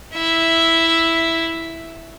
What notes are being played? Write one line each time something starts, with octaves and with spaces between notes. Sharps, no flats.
E4 E5